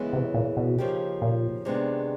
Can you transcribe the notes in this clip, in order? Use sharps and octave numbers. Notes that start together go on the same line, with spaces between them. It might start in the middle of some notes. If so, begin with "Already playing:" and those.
Already playing: F#2 C#3 E3 G#3 B3
C3
A#2
B2
C#3 F3 A#3 D#4 G4
A#2
C3 D#3 G#3 B3 D4